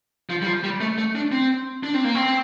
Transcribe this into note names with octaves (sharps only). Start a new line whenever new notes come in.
F3
G3
F3
G3
A3
A3
D4
C4
D4
C4
A#3
C4